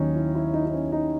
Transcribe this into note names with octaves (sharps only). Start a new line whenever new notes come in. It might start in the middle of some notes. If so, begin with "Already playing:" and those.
Already playing: D#2 D#3 F#3 C#4 D#4
E4
E4
D#4
D#4
C#4
D#4